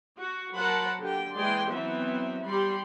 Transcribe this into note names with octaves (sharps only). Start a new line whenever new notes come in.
F#4
F#3 A#4 C5 F#5 A5 B5
D3 G4 G5
E3 G#3 G#4 D5 G5 C6
E3 F#3 B3 C4 E5
G3 G4 B5 C6